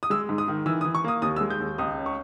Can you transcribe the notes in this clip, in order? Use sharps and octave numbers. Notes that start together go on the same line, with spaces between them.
D#6
G#3 E6
G#2
D#6
D#3
E3 E6
D#6
E3
C#6
A#3 D#6
D#2 D#6
E6
G#3
G6
D#2
C#2 D#6
C#4
C#6